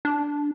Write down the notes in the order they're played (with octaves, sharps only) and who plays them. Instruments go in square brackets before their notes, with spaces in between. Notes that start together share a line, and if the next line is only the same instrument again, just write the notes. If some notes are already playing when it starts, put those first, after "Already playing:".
[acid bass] D4